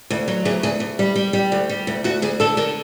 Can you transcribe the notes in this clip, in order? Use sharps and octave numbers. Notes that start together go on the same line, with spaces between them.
D2
F#3
D2 G#4
D2 G#4
D2
G3
G3
G3
D2
G3
D2
D2 F#4
D2 G#4
D3 A4
D3 A#4